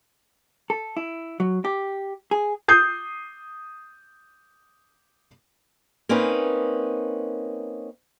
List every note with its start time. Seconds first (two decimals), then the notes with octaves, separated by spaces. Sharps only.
0.70 A4
0.97 E4
1.40 F#3
1.65 G4
2.31 G#4
2.68 D#6 G6 C7
6.09 A#3 C4 C#4 D#4 B4